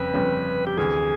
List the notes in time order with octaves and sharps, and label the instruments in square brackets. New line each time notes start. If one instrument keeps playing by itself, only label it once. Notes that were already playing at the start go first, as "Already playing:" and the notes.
Already playing: [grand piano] G1 F2 C#3 [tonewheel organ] B4
[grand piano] G1 F2 C#3
[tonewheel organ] G4
[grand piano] D2 C3 E3 [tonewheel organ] G#4